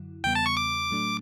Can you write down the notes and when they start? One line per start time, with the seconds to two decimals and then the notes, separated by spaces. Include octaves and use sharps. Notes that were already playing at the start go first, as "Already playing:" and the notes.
Already playing: F#2 D3 F#3 E4
0.24 E2 C#3 G3 B3 G5
0.35 A5
0.46 C#6
0.57 D6
0.91 A2 F#3 A3 D4